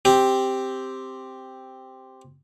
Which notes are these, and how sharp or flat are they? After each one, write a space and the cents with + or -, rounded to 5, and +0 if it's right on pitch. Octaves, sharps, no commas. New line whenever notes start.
C4 +0 G4 +0